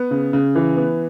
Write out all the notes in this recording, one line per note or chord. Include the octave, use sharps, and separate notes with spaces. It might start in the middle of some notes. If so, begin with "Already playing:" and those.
Already playing: B3
C#3
C#3
E3
B3